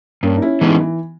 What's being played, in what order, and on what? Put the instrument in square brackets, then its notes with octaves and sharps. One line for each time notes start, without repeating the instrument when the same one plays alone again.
[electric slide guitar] G2 [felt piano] A#3 C#4
[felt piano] D#4
C#4 E4
[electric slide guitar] E3 G#3 C#4 E4 [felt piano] B3 D#4
[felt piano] E3